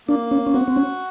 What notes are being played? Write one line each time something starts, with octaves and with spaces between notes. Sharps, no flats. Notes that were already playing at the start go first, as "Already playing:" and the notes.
A#3 D4
C#4
C#4
C4 F#4
C4
C#4